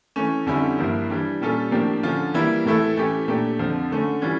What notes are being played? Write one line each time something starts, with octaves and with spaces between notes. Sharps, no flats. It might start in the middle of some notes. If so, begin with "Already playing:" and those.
E3 A3 C#4
F2 D3 G3 C#4 E4
G2 F3 A#3 E4
E3 G3 D4
A#2 G3 C#4 F4 A4
A2 F3 A#3 D4 G4
D3 F3 C#4 F4
E3 G3 A#3 E4
A2 E3 A3 E4 A4
E3 A3 C#4 G4
A#2 A3 D4 G4
F2 D3 F3
D3 A3 C#4
E3 G3 C#4 F4